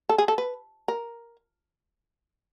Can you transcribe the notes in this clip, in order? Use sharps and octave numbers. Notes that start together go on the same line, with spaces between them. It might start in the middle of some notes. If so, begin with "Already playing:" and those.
A4
G#4
A4
B4
A#4